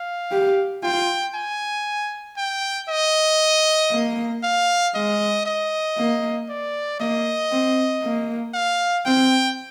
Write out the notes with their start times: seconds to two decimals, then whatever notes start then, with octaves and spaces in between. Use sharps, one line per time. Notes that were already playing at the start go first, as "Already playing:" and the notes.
Already playing: F5
0.31 G4
0.83 F4 G5
1.35 G#5
2.37 G5
2.89 D#5
3.91 A#3
4.43 F5
4.94 G#3 D#5
5.46 D#5
5.97 A#3
6.49 D5
7.00 A#3 D#5
7.51 C4
8.03 A#3
8.54 F5
9.05 C4 G5